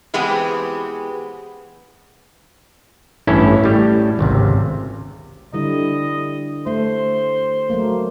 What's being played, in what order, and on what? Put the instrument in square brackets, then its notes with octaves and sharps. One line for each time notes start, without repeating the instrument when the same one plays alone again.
[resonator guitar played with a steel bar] E3 G#3 B3 C4 G4 G#4
[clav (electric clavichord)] A1 G2 C#4 E4 A4
A2 G3
G#1 C#2 C3
[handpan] D3 G3 E4 [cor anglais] D#5
[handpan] A3 [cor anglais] C5
[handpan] F#3 A3 A#3